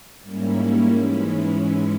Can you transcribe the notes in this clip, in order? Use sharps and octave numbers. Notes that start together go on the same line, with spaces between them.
G#2 G3 A#3 C#4 E4
G#2 E3 G#3 C#4 E4